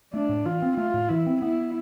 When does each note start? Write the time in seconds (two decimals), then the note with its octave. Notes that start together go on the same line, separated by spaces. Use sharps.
0.13 A3 D4
0.29 A2
0.45 E3 F4
0.62 C4
0.77 A3 F4
0.94 A2
1.09 E3 E4
1.27 C4
1.42 B3 E4